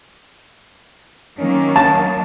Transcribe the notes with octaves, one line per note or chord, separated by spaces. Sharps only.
D#3 F#3 A#3 C#4
A5